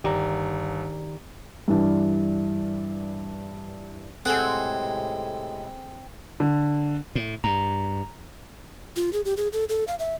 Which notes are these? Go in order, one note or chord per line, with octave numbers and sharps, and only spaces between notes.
G1 D#3 G4 D5 A#5
G2 E3 D4
A2 C3 G#3 C4 G#4 A4 F#5 G#5
D3
A2
G2 A#5
F4
G#4
G4
G#4
A4
A4
F5
E5